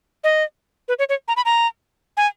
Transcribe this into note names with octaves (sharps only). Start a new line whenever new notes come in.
D#5
B4
C#5
C#5
A#5
B5
A#5
G#5